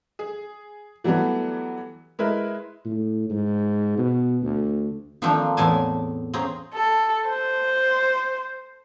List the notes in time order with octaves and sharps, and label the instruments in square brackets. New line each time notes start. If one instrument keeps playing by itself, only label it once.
[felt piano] G#4
E3 F#3 G3 A3 B3
G#3 E4 A#4 B4 E5
[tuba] A2
G#2
B2
D2
[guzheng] D#3 F3 A3 A#3 C4 D4
E2 A2 G#4 A4 G#5 A5
C4 C#4 G#4 A#5
[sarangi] A4
C5